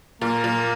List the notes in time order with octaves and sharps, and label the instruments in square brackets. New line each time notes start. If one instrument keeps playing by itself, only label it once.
[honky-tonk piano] A#2 [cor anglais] A#3
[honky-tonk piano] A#2